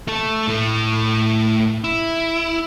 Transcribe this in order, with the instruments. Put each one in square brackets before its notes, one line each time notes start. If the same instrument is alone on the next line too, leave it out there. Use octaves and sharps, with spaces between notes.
[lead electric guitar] A3 A4
A2 A3
E4